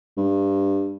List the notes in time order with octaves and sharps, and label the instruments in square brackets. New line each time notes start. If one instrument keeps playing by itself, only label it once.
[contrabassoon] G2